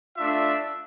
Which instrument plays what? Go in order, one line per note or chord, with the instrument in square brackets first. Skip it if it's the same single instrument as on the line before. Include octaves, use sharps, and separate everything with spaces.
[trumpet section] A3 D4 F4 E5